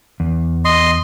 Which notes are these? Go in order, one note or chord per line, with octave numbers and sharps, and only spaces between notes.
E2
D#5 C6